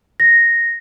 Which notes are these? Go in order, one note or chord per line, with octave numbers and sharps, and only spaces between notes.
A#6